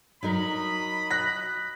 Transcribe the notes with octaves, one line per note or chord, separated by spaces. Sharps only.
F#3 D#4 A#4 D#5 B5
F#6 A#6 B6